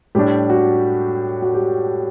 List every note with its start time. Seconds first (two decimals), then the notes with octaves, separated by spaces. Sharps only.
0.15 A2 G3 D4 G4
0.50 F#4
1.42 F#4
1.54 G4